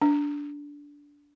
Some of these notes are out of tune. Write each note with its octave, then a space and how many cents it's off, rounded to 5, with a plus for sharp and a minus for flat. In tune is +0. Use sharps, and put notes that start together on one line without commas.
D4 -15